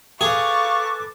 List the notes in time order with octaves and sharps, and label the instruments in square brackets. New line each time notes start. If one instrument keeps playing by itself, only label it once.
[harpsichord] G#4 [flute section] A4 B4 D6 [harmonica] F5 [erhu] C#6